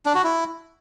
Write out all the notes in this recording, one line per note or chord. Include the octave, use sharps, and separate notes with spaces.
D4
F#4
E4